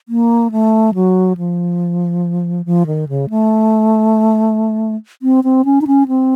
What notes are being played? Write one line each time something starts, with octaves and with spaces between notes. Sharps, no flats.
A#3
A3
F#3
F3
F3
D#3
C#3
A3
C4
C4
C#4
D#4
C#4
C4